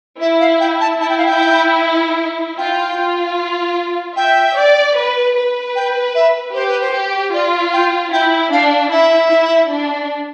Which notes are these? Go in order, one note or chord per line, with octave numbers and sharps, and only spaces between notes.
E4 E5
F5
G5
A5
E4 A5
G5
F5
G5
F4 G5
F4
E5 G5
D5
B4
B4
G5
E5
G4 C5
B4
C5
G4
F4 D5
G5
E4 G5
D4 F5
E4 E5
E4
D4